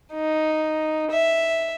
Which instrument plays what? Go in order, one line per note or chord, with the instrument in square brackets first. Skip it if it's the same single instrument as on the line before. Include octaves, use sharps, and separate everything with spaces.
[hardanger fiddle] D#4
E5